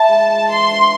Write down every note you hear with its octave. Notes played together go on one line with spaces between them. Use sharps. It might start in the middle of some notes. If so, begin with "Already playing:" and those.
Already playing: E4 A5
G#3
F4
E3 C6
D4